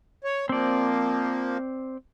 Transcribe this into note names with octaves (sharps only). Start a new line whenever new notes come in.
C#5
F3 A#3 C4 D5